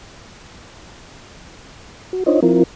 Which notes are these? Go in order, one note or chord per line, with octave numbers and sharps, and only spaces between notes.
F#4
D4 D#4 F4 C5 C#5 D#5
F3 C4 E4 F4 A#4